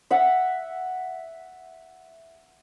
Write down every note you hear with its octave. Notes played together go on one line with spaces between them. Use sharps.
E5 F#5